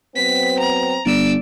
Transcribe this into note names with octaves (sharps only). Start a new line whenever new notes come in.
F#3 B3 C4 B6
A#5
G1 D5 E6